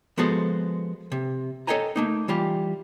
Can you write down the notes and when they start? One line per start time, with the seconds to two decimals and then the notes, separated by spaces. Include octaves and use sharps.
0.17 F3 G#3 B3 F#4 A4 C5
1.12 C3
1.67 A4 C#5 D#5 G5 G#5 A#5
1.96 A3 A#3 D#4
2.28 E3 G3 F4 G4